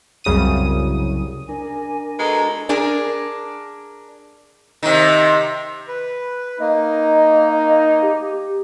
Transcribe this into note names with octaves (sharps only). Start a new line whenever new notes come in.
C2 F#2 C#3 D#6 D#7
D4 A#4 G#5
B2 G#3 A4 A#5
D4 G#4 A#4
C3 D#3
B4
A#3 D#4 D#5
G4